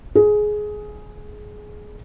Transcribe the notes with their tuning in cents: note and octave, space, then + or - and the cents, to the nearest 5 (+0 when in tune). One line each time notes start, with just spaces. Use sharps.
G#4 +15